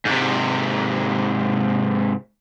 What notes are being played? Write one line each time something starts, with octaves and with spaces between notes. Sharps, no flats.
G#2 C3